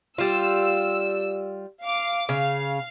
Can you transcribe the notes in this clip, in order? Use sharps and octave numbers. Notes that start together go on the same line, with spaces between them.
G3 F4 E6
F5 D6
C#3 F5